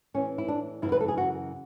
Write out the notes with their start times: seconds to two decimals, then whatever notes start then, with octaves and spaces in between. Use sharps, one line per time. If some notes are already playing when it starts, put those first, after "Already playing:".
0.14 A2 E3 C#4
0.38 E4
0.48 D4
0.82 F#2 C#3 E3 E4
0.92 B4
1.00 A4
1.08 G#4
1.17 F#4